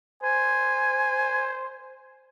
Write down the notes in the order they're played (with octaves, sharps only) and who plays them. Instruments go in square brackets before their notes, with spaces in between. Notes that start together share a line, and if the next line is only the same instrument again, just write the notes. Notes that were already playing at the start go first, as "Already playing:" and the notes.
[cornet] C5 [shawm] G#5